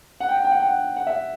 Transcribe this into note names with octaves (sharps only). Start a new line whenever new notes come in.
F#5
G5
F#5
G5
F#5
G5
F#5
F#5
E5